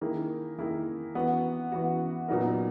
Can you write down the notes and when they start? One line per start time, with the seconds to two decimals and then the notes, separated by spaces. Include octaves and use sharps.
0.01 D#3 A#3 E4 G#4
0.58 D#3 A#3 E4 G#4
1.15 E3 B3 F#4
1.72 E3 B3 F#4
2.28 A#2 F#3 B3 D#4 A#4